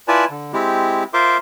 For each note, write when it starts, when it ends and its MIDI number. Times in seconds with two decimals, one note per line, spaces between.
0.08 0.25 64
0.08 0.25 65
0.08 0.25 71
0.08 0.25 74
0.08 0.25 80
0.08 0.25 81
0.30 0.52 50
0.53 1.03 56
0.53 1.03 60
0.53 1.03 64
0.53 1.03 67
1.14 1.37 65
1.14 1.37 70
1.14 1.37 72
1.14 1.37 76
1.14 1.37 84
1.14 1.37 86